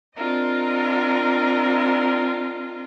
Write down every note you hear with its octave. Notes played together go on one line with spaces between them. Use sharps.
C4 D4 F4 A#4 D#5